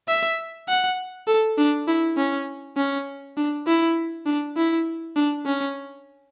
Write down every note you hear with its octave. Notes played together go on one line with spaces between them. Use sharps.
E5
F#5
A4
D4
E4
C#4
C#4
D4
E4
D4
E4
D4
C#4